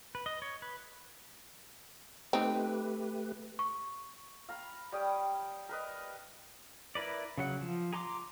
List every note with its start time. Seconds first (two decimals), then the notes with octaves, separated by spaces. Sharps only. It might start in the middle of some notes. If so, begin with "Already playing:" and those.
0.15 B4
0.26 D#5
0.42 C#5
0.62 B4
2.33 A3 C4 D#4 G4 B4
3.59 C#6
4.49 F5 A#5 B5
4.92 G3 C#5 G5 D#6
5.69 A#4 B4 D#5
6.95 E4 A#4 B4 D5
7.38 C#3 F#3 F#5
7.61 F3
7.93 G#4 A#5 C6 D6